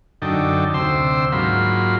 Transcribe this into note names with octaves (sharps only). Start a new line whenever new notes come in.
F#2 D3 D#4 A4 G5
D2 C3 C5 G5 C6 E6
G#2 F#3 A#3 F4 B5 C6